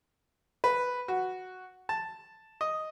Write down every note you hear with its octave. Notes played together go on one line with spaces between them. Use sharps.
B4
F#4
A5
D#5